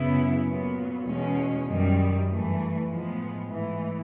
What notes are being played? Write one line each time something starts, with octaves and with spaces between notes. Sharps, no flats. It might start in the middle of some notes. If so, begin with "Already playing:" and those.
Already playing: F#2 C#3 F#3 B3 E4
A#2 F#3 B3
E2 B2 G#3 C#4
F#2 D#3 G3
G2 E3 A3
A2 F3 G#3 B3
G#2 E3 A3